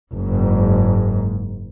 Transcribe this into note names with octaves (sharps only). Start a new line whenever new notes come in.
F#1 G#2